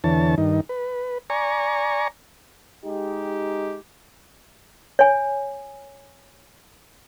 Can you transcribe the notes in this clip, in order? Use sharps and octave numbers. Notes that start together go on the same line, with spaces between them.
E2 D3 E3 C#5 A5
G2 D#3 D#4
B4
D5 G#5 A#5 C#6
G#3 D#4 G4
C#5 G#5